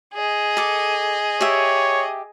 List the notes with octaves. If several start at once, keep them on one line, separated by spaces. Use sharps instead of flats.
G#4 D#5
A4 D6
G4 C#5 E5